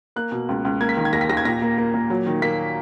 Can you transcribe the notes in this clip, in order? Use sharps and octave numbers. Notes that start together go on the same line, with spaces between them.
A#3 F#6
B2
C#2
C#2
A#3 G#6
B6
D#3
G#6
D#2 A#6
B6
D#2 A#6
G#6
A#2 A#6
A#3
A#3
A#2
F#3
D#3
A#3 B6